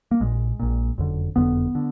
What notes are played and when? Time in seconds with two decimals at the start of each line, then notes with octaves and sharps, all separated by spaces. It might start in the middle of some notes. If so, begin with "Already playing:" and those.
0.11 A#3
0.20 A#1 A#2 G#3
0.60 A#1 A#2
0.98 F#1 F2 D3
1.36 F#1 F2 D3 B3
1.75 D3